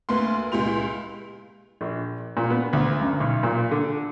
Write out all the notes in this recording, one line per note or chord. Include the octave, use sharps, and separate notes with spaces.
D2 A#3 B4 C6
C#2 A#2 E4 G4 C6 F7
A#1
A#2
B3
D2
F#2
B1
A#2
D3